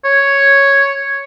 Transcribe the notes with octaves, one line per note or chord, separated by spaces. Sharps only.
C#5